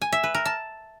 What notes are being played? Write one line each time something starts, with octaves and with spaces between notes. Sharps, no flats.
G#5
E5
B4
A#4
A5